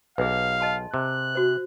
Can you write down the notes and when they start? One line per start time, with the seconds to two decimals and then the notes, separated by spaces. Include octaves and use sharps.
0.18 B1 G#4 B4 F5
0.61 D#5 A5 C6
0.94 C3 F#6
1.35 F#4 C5